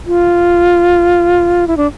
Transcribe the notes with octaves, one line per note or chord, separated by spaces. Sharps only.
F4
E4
D4